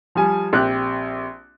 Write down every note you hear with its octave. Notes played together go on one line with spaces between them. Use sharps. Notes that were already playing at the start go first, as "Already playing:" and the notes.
F3 G3 G#5
A#1 C4 G4 F#6